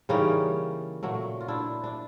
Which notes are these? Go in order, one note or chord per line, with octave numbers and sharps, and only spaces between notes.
C#3 E3 G3 A#3 C#4 D#4
A#2 F#3 A3
F4
D4 E4
D4